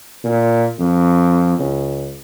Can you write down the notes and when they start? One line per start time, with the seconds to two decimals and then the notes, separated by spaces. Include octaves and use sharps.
0.24 A#2
0.79 F2
1.59 C#2